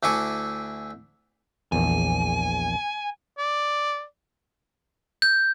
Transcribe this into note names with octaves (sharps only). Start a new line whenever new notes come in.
D2 D4 E4 G#5 C#6 D6
A#1 E2 G#5
D5
G6